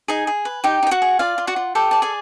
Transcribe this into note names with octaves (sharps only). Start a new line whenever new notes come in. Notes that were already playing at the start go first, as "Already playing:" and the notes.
D#4 G#4 G#5
G#4
B4
D#4 G4 G5
D#4
G5
F#4 F#5
G#4
F4 D5 F5
F4
F#4 F#5
F4
G4 A4 G5
D5 A5
G#4 G#5